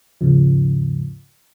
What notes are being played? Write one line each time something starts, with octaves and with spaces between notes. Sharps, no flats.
D#2 G#2 C#3 F3